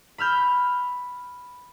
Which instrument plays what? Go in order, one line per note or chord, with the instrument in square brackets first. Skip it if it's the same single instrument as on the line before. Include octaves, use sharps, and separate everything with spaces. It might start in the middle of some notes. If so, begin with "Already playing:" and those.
[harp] B5 E6 F6 G6